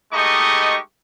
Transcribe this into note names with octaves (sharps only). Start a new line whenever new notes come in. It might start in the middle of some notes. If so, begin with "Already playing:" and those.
G#3 A3 D#4 G4 D#5 C#6